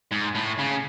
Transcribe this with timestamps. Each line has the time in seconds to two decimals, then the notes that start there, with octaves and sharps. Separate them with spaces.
0.11 G#2
0.35 A2
0.59 C#3